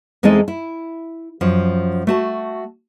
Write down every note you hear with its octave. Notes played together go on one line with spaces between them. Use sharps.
E2 G#3 C4 D#4 A4 D#5
E4
F#2 F3
A3 F#4 A5